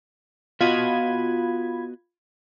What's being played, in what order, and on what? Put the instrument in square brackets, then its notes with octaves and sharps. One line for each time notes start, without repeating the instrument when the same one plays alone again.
[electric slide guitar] B3 F#4 D#5 [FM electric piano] F4 B5 G#6